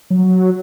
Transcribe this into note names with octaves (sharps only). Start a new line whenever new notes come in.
F#3